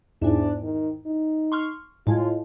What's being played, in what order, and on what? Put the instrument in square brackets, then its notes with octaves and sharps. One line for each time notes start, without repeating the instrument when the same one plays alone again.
[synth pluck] E2 G#2 [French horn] D4
[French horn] D#3
D#4
[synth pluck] C6 C#6 F6
[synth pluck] A2 G#3 [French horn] F4